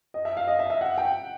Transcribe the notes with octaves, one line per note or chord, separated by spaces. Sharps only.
D#5
E5
F5
D#5
E5
E5
F#5
G5